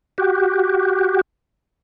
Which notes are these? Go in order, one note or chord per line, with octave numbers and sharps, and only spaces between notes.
F#4 G4